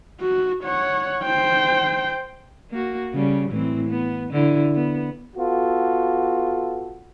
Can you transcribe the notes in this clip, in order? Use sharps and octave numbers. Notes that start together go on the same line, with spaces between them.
F#4
C#5 F#5
C5 G5
A#3 F#4
C#3 G3
A2 E3 C4
B3
D3 E4
B3
B3 F4 F#4 A4